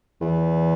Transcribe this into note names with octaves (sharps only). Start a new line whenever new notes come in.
E2